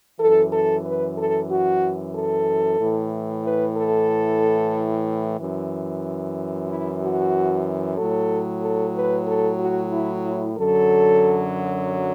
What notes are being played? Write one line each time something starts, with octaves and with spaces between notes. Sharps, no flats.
F#2 E3 A4
A4
B4
A4
F#4
A4
A2 E3
B4
A4
F#2 E3
E4
F#4
A2 F#3 A4
A4
B4
A4
F#4
E4
E4
F#2 D3 F#3 A4